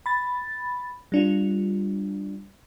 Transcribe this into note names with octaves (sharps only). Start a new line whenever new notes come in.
B5 A6
G3 D4 F4